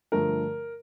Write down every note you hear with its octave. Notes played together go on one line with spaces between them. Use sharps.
G2 D3 F3 A3 A#4